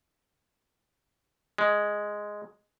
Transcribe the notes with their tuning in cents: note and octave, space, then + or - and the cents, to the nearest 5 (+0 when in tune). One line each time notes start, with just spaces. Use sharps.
G#3 +0